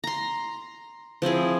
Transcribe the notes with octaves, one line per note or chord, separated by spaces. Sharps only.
A#5 C6
F3 C4 E4 G#4